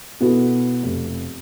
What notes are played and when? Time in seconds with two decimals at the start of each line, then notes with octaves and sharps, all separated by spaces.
0.20 B2 B3 E4 F#4 A4
0.83 F1